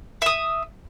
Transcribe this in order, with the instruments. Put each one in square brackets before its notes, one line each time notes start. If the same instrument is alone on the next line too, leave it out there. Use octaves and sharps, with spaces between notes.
[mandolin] E5 D#6